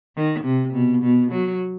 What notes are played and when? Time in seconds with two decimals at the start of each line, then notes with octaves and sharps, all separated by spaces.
0.16 D#3
0.45 C3
0.73 B2
1.03 B2
1.32 F#3